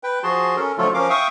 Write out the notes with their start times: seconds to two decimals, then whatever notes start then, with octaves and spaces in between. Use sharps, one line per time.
0.03 B4 G5
0.23 F3 F#4 G#4 A5 C6
0.56 C#4 A4 A#4
0.78 D3 F3 F#3 A3 F4 A4
0.94 F3 C#4 A#4 F5 D6
1.10 E5 F5 G5 C#6 D#6